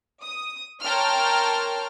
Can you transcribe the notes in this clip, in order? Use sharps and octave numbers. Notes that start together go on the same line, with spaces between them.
D#6
A#4 C#5 G5 A5 C6 F6